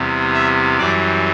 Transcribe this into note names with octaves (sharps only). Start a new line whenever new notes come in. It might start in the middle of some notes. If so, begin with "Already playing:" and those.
Already playing: E2 C3 G3
E5
F#2 E3 G3 D5